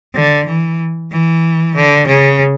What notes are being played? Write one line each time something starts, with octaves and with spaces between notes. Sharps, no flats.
D3
E3
E3
D3
C#3